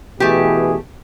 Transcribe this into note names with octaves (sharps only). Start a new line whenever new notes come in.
B2 E3 A3 G4 G#4